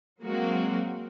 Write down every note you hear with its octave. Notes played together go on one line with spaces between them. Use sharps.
F#3 G#3 A#3 C4 F#4